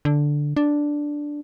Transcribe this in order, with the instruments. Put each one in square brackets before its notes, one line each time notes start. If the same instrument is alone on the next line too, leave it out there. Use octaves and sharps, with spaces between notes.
[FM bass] D3
D4